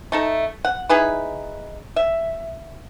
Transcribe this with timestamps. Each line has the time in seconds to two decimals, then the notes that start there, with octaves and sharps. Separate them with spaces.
0.12 A3 D#4 A4
0.65 F#5
0.89 D#4 E4 G#4 B4
1.96 E5